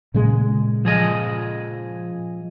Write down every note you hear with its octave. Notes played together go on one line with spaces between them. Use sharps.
A#2 C#3 G#3
F3 G#4 D#5